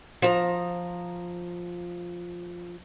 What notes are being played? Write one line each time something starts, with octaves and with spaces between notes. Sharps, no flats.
F3 A#5